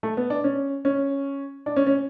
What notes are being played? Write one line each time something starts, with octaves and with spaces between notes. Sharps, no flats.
A3
B3
D4
C#4
C#4
D4
C#4
C#4